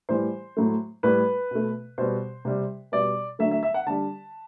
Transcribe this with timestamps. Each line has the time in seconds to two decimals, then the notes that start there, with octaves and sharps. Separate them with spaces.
0.09 A2 E3 G3 C5
0.57 A2 F#3 A3
1.03 A2 G3 B4
1.51 B2 A3
1.98 B2 G3 C5
2.45 C3 G3
2.92 B2 G3 D5
3.39 D3 F#3 A3 E5
3.51 E5
3.63 E5
3.74 F#5
3.86 D3 G3 A5